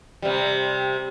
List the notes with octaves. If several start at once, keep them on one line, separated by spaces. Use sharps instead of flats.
C3 G3